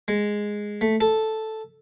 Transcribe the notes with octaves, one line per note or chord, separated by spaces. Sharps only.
G#3
A3
A4